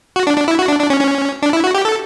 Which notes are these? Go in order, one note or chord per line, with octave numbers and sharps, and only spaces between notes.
F#4
D4
D4
E4
F#4
D4
D4
C#4
C#4
D4
E4
F#4
G4
A4